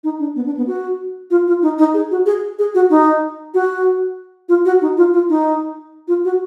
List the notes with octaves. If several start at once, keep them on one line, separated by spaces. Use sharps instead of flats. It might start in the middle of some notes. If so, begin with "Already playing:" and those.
D#4
D4
B3
D4
B3
F#4
F4
F4
D#4
D#4
G#4
F#4
G#4
G#4
F#4
D#4
F#4
F4
F#4
D#4
F4
F4
D#4
F4
F#4